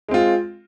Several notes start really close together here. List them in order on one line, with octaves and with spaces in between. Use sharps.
G#3 C4 F4